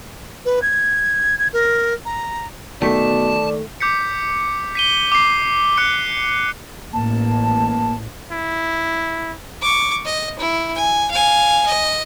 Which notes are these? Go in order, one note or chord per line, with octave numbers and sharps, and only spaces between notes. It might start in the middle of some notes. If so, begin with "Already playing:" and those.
B4
G#6
G#6
A#4
A#5
B2 D#3 A3 D5 A5
D6 G6 B6 C#7
B6 D#7 G7
D6 C7
D6 F#6 C#7
A1 A#3 A5
E4
C#6 D6
D#5
E4
G#5
F5 G#5
D#5